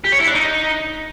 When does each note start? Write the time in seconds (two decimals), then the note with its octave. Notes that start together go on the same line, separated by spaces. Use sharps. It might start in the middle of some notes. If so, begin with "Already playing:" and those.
0.05 G4
0.12 C#5
0.20 E4
0.27 D4
0.35 D#4